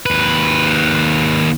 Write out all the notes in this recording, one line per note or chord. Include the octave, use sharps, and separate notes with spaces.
D#2 B4